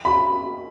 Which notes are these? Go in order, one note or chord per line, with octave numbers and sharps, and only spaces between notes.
B5